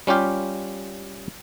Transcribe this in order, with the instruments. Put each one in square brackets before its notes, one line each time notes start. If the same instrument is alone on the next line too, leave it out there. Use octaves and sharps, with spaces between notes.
[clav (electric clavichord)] G3 C#4 F4 G4 F5